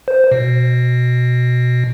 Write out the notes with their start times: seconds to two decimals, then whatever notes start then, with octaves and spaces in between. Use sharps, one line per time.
0.08 C5
0.32 B2